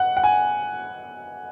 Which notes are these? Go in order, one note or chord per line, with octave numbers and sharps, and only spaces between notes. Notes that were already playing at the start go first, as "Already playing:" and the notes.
Already playing: F#5
F#5
G#5